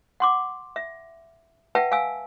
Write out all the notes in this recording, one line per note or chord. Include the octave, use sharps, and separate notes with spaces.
F#5 C6 D6
E5
B4 E5 F#5 G5 A5
F5 G#5 E6